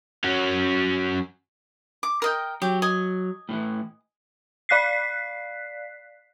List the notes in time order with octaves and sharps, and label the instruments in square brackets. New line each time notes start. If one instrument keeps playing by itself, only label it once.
[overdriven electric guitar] F#3 C#4
[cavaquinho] D6
A#4 D#5 G5
[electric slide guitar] F#3 [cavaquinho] G4
[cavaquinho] D#5 G#5
[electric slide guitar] A2 D#3 E3
[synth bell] D5 F5 F#6 B6 C7